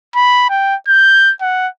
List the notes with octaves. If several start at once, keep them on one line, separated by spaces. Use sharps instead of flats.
B5
G5
G6
F#5